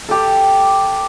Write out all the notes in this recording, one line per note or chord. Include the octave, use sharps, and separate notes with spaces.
G4 A4